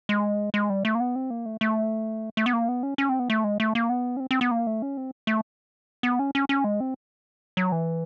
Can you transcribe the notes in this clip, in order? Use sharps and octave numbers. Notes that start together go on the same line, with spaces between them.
G#3
G#3
G3
A3
A#3
B3
C4
A#3
A3
A3
A3
B3
A#3
B3
C#4
C#4
C4
B3
A3
G#3
A3
A#3
B3
C#4
C4
C4
B3
A#3
A3
C#4
C4
A3
B3
C#4
C#4
C#4
G#3
C4
F#3
E3